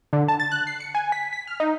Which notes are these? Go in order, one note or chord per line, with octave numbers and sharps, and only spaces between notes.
D3
A5
A6
F#6
C7
C#7
G#5
B6
B6
F6
D#4